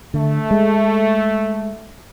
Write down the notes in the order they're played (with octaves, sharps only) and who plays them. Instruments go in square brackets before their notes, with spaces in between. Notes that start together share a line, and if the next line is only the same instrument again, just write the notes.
[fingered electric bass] D3 [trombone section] A3
[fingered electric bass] G#3